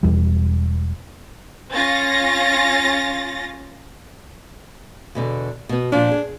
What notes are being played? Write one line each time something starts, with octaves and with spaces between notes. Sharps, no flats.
E1 E2 G3
C#4 F4 A6 A#6
E2 B2 D3
B2 B3
A#2 F3 D4
G#4